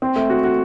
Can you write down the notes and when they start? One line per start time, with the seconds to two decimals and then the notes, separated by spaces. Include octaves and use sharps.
0.02 C4
0.16 A3
0.30 F#4
0.44 F#4